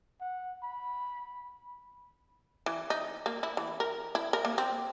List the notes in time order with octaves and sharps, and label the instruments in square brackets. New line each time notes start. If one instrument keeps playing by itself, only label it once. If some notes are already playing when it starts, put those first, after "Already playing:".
[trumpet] F#5
B5
[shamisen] E3
D#4
A#3
E4
E3
A#4
E4
A#4
A#3
C4